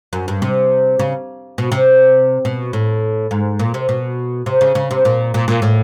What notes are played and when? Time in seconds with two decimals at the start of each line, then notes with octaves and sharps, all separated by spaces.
0.13 F#2
0.28 G2
0.42 C3
0.99 C#3
1.58 B2
1.72 C3
2.45 B2
2.73 A2
3.31 G#2
3.59 A#2
3.74 C3
3.89 B2
4.46 C3
4.61 C#3
4.75 C#3
4.91 C3
5.05 A#2
5.34 A#2
5.48 A#2
5.62 A2